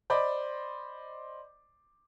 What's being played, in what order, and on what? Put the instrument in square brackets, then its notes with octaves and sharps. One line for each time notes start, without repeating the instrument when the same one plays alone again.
[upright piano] C5 D5 D#5 B5 D6